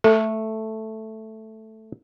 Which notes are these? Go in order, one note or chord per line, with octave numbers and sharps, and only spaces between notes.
A3 A4